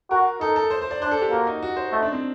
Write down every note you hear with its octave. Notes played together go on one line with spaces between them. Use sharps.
F#4 A#4
D#4 A4
A4
C5
C5
D5
D4 C5
A4
G4
A#3 F#4
D#4
F#4
C5
A3 D#4
D4
C4